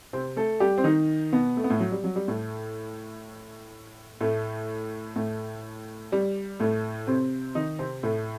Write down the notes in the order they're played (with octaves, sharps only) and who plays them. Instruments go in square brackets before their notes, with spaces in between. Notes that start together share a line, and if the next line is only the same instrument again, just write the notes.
[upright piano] C3 C4
A3 A4
G3 G4
C4
D#3 D#4
B2 B3
A3
B3
A2 A3
F#3
G3
F#3
G3
A2 A3
A2 A3
A2 A3
G3
A2 A3
C3 C4
D#3 D#4
C3 C4
A2 A3